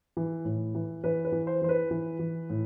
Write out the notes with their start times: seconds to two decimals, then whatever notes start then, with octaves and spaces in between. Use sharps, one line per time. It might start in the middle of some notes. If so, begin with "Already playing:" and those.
0.17 E3
0.45 A2
0.75 E3
1.04 E3 B4
1.25 B4
1.32 E3
1.47 C5
1.62 E3 C5
1.69 B4
1.91 E3
2.19 E3
2.50 A2